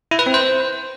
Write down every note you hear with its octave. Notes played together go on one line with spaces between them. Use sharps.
E4
B4
C4
C5